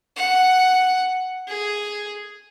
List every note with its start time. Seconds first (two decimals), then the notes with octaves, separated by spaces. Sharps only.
0.16 F#5
1.48 G#4